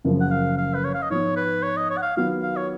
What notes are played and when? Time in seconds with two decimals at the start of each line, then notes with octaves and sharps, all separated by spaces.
0.04 F#1 F#2 F3
0.20 F#5
0.31 F5
0.58 F5
0.74 B4
0.84 C#5
0.94 F5
1.02 D#5
1.10 G#2 F3 B3 C#5
1.36 B4
1.63 C#5
1.77 D#5
1.90 C#5
1.97 F#5
2.02 F5
2.17 D#3 F#3 B3 F4 F5
2.43 F5
2.56 C#5